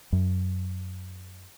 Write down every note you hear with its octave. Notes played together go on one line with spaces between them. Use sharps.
F#2